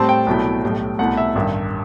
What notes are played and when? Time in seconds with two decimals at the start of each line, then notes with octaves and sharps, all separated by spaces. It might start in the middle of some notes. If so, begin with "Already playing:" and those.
Already playing: A2 G3 C4 A5
0.09 G5
0.27 C2 B2 F#3 A3 E4
0.63 B1 A2 G3
0.99 C2 B2 A3 E4 F#5
1.17 E5
1.35 A1 G2 D#3